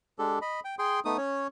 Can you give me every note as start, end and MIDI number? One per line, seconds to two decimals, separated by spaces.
0.19 0.39 56
0.19 0.39 62
0.19 0.39 67
0.19 0.39 69
0.41 0.60 75
0.41 0.60 83
0.65 0.75 79
0.79 1.00 68
0.79 1.00 79
0.79 1.00 84
1.05 1.17 57
1.05 1.17 59
1.05 1.17 63
1.05 1.17 87
1.17 1.47 61
1.17 1.47 73